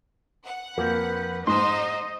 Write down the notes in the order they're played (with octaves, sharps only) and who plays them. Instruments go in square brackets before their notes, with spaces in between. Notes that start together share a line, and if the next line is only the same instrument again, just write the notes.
[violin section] F#5
[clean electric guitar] F2 F3 [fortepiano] A#3 [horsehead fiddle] B4
[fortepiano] G#2 [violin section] D#4 C5 [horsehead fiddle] D#5 [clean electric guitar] C6